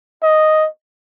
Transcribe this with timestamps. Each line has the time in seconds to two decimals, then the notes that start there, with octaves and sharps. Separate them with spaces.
0.23 D#5